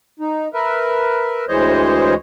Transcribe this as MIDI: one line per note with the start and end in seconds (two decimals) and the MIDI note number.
0.20 0.48 63
0.54 1.45 70
0.54 1.45 71
0.54 1.45 76
1.49 2.14 38
1.49 2.14 52
1.49 2.14 56
1.49 2.14 72
1.49 2.14 73
1.49 2.14 75